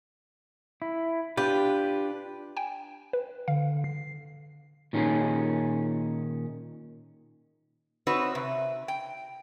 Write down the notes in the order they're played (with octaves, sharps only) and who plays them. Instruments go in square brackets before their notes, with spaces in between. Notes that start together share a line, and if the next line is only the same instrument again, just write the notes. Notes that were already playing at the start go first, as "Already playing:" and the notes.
[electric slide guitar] E4
[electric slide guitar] D4 F4 B4 [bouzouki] G4
[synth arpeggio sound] G5 G#5
B4
[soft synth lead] D3 [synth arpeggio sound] F5
[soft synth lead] C7
[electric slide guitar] A#2 D#3 C#4 D#4 G#4
[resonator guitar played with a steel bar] C4 D#4 F#4 B4 C#5
C3
G5